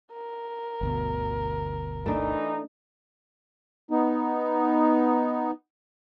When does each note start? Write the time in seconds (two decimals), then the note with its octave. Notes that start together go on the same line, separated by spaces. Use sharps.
0.13 A#4
0.81 G1 D2 B2
2.06 E3 A3 D4 D#4
3.91 B3 D#4